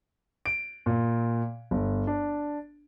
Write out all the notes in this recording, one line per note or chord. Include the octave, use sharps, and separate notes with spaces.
D7
A#2
G1
D4